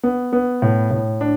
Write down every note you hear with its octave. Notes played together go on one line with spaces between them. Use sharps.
B3
B3
A2
A2
D4